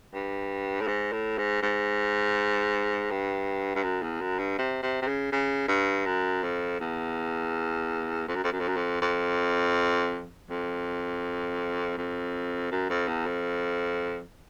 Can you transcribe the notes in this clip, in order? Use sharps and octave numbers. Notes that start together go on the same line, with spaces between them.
G2
A2
G#2
A2
G#2
G#2
G2
G2
F#2
E2
F#2
G2
C3
C3
C3
C#3
C#3
G2
F#2
F2
E2
F2
F#2
F2
F#2
F2
F#2
F2
F2
F2
F2
F#2
F2
E2
F2